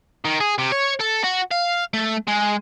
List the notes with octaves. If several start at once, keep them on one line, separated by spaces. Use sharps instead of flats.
D#3
G#4
C3
C#5
A4
F#4
F5
A3
G#3